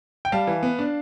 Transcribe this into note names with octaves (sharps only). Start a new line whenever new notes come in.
G5
G3 F5 A5
E3
B3
D4